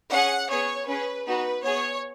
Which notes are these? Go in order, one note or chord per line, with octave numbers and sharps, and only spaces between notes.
C#4 G#4 F#5
B3 G#4 C#5
C#4 G#4 B4
B3 D#4 F#4 B4
B3 G#4 C#5